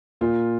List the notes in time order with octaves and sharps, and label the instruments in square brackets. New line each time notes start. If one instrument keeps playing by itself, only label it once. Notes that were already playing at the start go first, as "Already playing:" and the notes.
[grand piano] A#2 F4